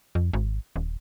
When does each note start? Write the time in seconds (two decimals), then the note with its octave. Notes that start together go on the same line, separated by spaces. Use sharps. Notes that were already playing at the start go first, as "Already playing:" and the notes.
0.15 F2
0.33 G#1
0.76 D#1